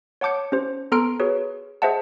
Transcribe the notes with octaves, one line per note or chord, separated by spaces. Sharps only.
C#5 F#5 A5 D6 G6 C#7
C#4 G4 C5
B3 A4 A#5 C6 F6 D7
F#4 G#4 B4 C#5
G#4 C5 D#5 E5 F#5 A5